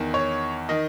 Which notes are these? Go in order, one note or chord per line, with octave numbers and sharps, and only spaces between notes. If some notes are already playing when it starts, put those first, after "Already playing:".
Already playing: E2 D#3
C#5
D#3 D#5